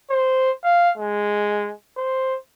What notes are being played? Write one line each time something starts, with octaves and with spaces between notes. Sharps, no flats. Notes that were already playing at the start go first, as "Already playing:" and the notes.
C5
F5
G#3
C5